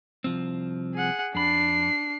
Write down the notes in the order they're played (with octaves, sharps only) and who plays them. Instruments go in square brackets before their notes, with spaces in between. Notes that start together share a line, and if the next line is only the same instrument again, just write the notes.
[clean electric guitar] C2 F3 C4
[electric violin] G#4 F#5
[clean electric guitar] F2 B5 [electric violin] D4 C7